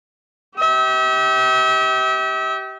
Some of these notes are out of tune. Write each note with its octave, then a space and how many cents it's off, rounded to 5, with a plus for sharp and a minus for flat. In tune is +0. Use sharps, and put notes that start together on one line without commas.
G4 -25 E5 -45